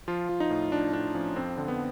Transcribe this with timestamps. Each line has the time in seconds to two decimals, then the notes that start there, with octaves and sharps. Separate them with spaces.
0.08 F3 F4
0.29 F3
0.40 D#4
0.51 A2
0.72 F3 D4
0.93 A2 D4
1.14 F3 C#4
1.36 F2 C4
1.57 D3
1.68 B3